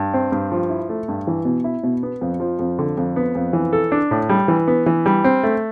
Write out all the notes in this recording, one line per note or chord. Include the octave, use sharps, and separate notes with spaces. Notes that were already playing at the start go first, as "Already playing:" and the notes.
Already playing: G2
C4
G2
F3
E4
A3
G2
E3
B2
E4
B2
B3
F2
F3
F2
D3
F2
B3
F2
E3
A4
D4
A2
G3
E3
B3
E3
G3
C4
A3